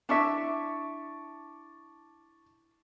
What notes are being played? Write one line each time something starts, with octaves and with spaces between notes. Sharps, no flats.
D4 E4 E5 A5 C#6 D6